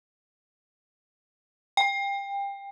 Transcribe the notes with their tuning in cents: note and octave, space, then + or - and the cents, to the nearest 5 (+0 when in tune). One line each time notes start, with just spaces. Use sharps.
G5 +25